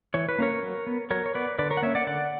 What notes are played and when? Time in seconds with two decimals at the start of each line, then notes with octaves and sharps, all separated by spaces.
0.14 E3 C#5
0.29 B4
0.39 A#3 C#4 A#4 C#5
0.63 F#3
0.87 B3
1.10 F#3 A#4 C#5
1.26 C#5
1.34 B3 B4 D5
1.59 D3 B4 D5
1.70 A#4 C#5
1.77 F#5
1.82 A#3 C#4 C#5 E5
1.95 D5 F#5
2.07 D3 D5 F#5